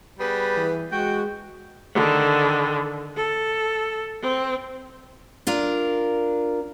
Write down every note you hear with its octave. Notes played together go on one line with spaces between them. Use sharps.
G3 B3 G#4 B4
E3
G#3 F#4 G5
D3 D#3
A4
C4
D4 F4 A#4